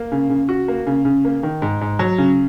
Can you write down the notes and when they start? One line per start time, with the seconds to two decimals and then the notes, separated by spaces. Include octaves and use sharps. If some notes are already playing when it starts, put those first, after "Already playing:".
Already playing: A#3
0.12 C#3
0.29 C#3
0.49 F#4
0.68 A#3
0.86 C#3
1.05 C#3
1.25 A#3
1.43 D#3
1.62 G#2
1.81 G#2
1.99 F#3
2.18 C#3